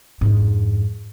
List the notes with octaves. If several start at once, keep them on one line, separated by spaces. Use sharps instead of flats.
F2 G#2